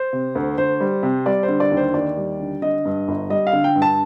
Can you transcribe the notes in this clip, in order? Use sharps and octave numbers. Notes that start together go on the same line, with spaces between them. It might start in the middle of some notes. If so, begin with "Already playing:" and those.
Already playing: C5
C3
D2
D2 C5
G3
C3
G3 D5
C5
D3
D5
D#2
C5
D#2 D5
G3
D3
D3 D#5
G2
G1
G3 D#5
F5
D3
G5
G2
A5